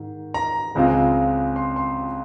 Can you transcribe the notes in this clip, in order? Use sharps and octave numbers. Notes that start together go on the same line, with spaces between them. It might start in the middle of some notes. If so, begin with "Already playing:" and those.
Already playing: G#2 D#3
A#5
C#2 C#3 G#3 C4 F4
C6
C6